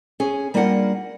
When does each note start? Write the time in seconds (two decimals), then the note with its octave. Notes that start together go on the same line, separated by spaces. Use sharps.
0.20 C#4 G#4
0.54 G3 A#3 D4 F4 A#4 F#5